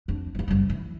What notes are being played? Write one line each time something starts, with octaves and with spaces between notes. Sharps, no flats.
F2 D4
E3 F3
F#1 G3
E3